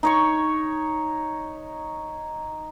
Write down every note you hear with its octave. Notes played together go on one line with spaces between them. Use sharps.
D#4 C#5 C#6